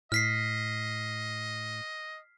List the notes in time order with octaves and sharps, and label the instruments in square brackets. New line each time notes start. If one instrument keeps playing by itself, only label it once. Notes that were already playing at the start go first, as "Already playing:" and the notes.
[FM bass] A2 [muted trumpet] D#5 [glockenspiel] F6 B6 C7